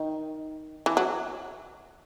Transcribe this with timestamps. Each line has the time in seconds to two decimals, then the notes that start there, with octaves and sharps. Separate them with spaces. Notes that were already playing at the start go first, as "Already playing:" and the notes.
Already playing: D#3
0.86 E3
0.97 F#3